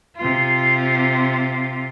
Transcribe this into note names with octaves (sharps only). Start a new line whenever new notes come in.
C3 F4